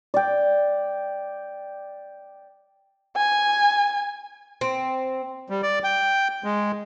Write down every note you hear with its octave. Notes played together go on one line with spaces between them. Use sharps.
D5 G5
G#5
C4
G3
D5
G5
G#3